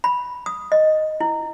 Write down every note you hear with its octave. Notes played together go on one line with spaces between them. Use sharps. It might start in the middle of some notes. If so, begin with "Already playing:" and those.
B5
D#6
D#5
E4